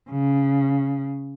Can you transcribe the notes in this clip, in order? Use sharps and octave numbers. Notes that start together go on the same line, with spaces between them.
C#3